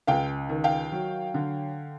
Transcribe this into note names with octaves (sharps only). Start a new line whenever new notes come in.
C#2 F5 G5
D#3
F5 G5
F#3
D3